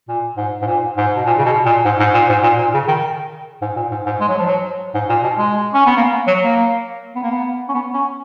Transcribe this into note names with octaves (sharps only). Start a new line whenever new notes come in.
A#2
G#2
G#2
A#2
G#2
B2
A#2
C#3
B2
A#2
G#2
G#2
A#2
G#2
A#2
A#2
C#3
D#3
G#2
A#2
G#2
G#2
G#3
F#3
F3
F#3
G#2
A#2
B2
G#3
C#4
B3
A#3
F#3
A#3
B3
A#3
B3
C#4
B3
C#4